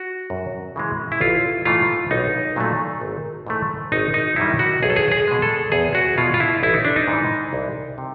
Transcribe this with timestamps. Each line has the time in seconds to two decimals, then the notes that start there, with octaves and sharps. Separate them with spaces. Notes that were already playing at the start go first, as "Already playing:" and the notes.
Already playing: F#4
0.30 F#2
0.76 C#3 E3 G#3
1.12 E4
1.21 A1 F4
1.65 G#2 E3 A3 F4
2.11 B1 D#4
2.56 A#2 F#3 A3
3.01 G#1
3.47 G#2 E3 A3
3.92 G#1 D#4
4.14 D#4
4.36 F#2 D#3 G3 E4
4.59 F#4
4.82 B1 G#4
4.90 A4
4.96 G#4
5.12 G#4
5.27 B2 G#3
5.42 A4
5.72 E2 G#4
5.95 F#4
6.18 B2 G#3 F4
6.34 F4
6.40 E4
6.63 A1 E4
6.74 D#4
6.85 D4
6.96 D#4
7.07 G#2
7.13 E3
7.53 C2
7.98 C3